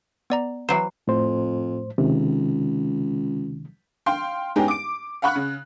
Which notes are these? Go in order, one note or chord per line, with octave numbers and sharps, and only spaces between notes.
B3 D5 A#5
E3 F#3 C5
F2 A2 C5
C#2 C3 D#3
F5 G5 C6
G#2 G#3 B3 C#4 D#4 G4
D6 D7
F5 F#5 B5 C#6 F#6
C#3